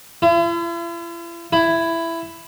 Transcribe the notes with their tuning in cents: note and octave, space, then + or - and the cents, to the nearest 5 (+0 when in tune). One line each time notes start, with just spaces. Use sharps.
E4 +45
E4 +10